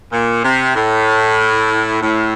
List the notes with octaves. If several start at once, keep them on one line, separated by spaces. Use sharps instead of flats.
A#2
C3
A2
A2